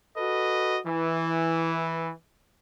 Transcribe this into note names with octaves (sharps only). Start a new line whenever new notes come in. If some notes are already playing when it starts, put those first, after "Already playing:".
F#4 A4 B4 D#5
E3